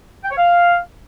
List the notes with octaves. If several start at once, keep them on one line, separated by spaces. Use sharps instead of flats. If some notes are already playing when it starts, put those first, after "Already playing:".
G5
C#5
F5